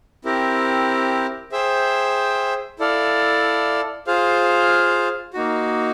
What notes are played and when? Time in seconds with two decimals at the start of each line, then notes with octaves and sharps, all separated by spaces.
0.25 C4 E4 G4 A#4
1.52 G#4 C5 E5 G5
2.79 E4 A4 D5 F5
4.07 F4 G#4 C5 F5
5.34 A#3 D#4 F#4